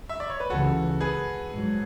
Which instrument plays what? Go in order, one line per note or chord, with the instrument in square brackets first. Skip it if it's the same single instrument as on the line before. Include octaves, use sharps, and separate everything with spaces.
[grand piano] E5
D5
C#5
B4
[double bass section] C#2 C#3 E3 [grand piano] F#4 A4
[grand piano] G#4 B4
[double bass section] G#2 F#3